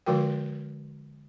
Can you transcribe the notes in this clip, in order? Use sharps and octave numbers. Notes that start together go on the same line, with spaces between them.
D3 F3 G#3 F#4 A#4 G5